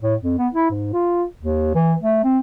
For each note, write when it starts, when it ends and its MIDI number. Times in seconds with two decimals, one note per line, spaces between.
0.02 0.15 45
0.22 0.37 41
0.38 0.48 59
0.54 0.69 64
0.70 0.92 44
0.93 1.23 65
1.40 1.73 39
1.75 1.94 52
2.01 2.19 57
2.23 2.39 60